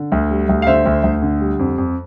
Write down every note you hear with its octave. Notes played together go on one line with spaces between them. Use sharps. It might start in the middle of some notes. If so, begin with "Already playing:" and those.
Already playing: D3
D2
G3
D2
F5
D3 C5 E5
D2
D2
D3
G3
F2
F2